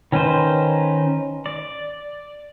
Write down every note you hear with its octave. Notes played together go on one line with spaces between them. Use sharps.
D#3 C#4 D#4 B4 C5
D5